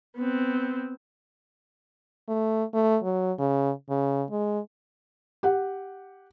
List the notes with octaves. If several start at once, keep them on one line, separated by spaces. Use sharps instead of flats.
B3 C4
A3
A3
F#3
C#3
C#3
G#3
G4 F#5